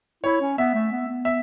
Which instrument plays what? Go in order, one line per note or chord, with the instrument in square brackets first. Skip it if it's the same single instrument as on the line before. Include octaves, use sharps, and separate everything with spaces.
[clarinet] E4 [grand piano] C#5
[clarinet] C#4
[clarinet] B3 [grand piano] E5
[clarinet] A3
B3
B3
[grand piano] E5